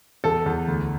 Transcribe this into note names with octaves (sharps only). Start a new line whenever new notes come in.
E2 A4
E2
D2